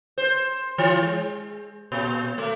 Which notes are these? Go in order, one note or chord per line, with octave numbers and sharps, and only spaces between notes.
C5
E3
G#3
A#2
A3